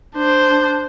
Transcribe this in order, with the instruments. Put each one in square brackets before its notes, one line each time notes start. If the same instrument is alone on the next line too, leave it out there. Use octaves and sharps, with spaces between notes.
[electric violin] D4 C5